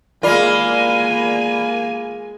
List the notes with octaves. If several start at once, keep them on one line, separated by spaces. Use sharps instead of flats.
G#3 A#3 F4 A#4 D5 G#5 B5